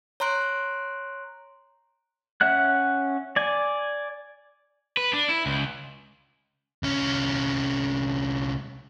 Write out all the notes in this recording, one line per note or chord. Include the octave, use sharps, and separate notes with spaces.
C#5 A#5 C6 F#6 D7
C#4 E5 F#5 F#6
D5 G#5
B4
D4
E4
C#2
C2 C#4